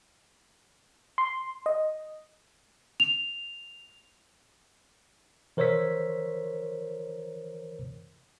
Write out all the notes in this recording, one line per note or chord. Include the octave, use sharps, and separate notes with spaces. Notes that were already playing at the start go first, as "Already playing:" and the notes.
C6
D#5
F7
E3 A#4 C5 C#5 E6 B6